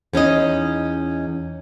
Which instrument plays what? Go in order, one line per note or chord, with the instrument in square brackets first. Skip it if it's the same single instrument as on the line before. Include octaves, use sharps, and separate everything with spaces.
[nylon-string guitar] E2 C#4 D#4 D#5